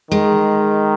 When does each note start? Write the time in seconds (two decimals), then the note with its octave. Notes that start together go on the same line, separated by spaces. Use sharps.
0.11 D#3 G#3